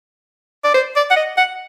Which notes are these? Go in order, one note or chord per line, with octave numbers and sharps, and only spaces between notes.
D5
C5
D5
F#5
D#5
F#5